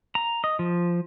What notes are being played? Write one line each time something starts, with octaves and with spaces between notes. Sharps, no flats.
A#5
D#5
F3